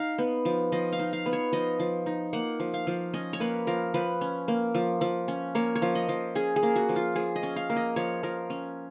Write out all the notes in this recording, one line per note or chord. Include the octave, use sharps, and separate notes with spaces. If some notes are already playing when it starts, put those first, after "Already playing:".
Already playing: D#4 F5
B3
F3
F3 D#5
F5
D#4
F5
B3
C#5
F3 D#5
F3
D#4
A#3 F#5
F3
F5
F3
C#4 D#5
C#5
A#3 B4
F3 A#4
F3 B4
C#4
A#3
F3
F3
C#4
A#3 C#5
C#5
F3
D#5
F3
C#4 G#4
G#4
A#3
F#4
F3
F4
F3 G#4
D#5
C#4
F5
A#3
D#5
F3 C#5
F3 A#4
C#4